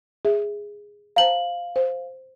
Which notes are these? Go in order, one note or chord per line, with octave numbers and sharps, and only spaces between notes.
G#4 E5
C5 F5 A5 A#5 F#7
C5